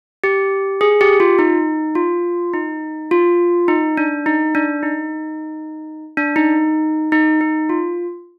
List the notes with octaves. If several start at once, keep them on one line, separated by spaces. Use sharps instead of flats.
G4
G#4
G4
F4
D#4
F4
D#4
F4
D#4
D4
D#4
D4
D#4
D4
D#4
D#4
D#4
F4